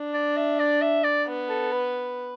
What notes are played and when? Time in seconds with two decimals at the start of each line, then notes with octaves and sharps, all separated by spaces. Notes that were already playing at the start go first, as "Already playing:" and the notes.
Already playing: D4
0.14 D5
0.37 E5
0.60 D5
0.82 E5
1.04 D5
1.27 B3
1.49 A4
1.72 B4